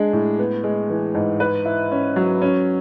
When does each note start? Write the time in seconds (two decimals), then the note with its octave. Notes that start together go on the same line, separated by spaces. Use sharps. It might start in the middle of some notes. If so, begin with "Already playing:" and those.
Already playing: G#3 D4
0.13 A2
0.39 B3
0.64 G#3
0.90 E3
1.14 G#2
1.40 B4
1.65 E4
1.92 C#4
2.16 F#3
2.41 C#4